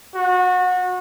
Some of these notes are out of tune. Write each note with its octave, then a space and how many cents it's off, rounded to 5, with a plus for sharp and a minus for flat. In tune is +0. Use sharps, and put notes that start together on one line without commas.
F#4 -30